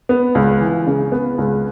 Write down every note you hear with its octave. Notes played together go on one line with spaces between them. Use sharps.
B3
C#2
E3
C#3
B3
C#2